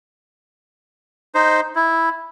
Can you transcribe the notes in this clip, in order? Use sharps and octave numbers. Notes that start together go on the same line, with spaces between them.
D#4 C5
E4